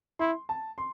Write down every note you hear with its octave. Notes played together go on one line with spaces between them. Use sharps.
E4 C6
A5
C6